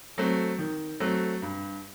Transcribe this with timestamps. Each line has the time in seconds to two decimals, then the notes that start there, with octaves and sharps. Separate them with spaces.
0.18 F#3 A3 C4
0.59 D#3
1.00 F#3 A3 C4
1.42 G2